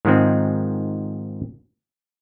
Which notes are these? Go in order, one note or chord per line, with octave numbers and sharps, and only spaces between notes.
G#2 D#3 F3 G#3 C4